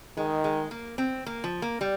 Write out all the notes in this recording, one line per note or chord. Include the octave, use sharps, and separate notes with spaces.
D#3 G#3
G#3
A#3
C4
A#3
F3
A#3
G3